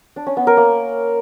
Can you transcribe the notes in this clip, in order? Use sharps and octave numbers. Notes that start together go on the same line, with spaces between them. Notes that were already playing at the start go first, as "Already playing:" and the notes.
D4
C#4
B3
A#4
A#3